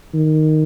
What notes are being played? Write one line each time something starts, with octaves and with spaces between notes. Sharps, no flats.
D#3